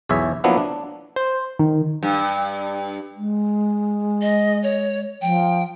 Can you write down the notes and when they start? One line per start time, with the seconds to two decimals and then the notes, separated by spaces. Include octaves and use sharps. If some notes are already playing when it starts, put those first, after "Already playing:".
0.09 B1 E2 G#4 C#5 E5
0.44 F3 F#3 A#3 B3 D4 E4
0.58 D4
1.16 C5
1.59 D#3
2.03 G2
3.16 G#3
4.21 D#5
4.63 C#5
5.21 F3 G5